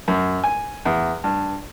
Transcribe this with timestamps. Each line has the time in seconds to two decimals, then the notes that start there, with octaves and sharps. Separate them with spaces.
0.08 F#2
0.44 G#5
0.85 E2
1.24 G2